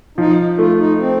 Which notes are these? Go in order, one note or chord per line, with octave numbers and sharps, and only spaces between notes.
F3 D#4
A3 F4
D#4
C4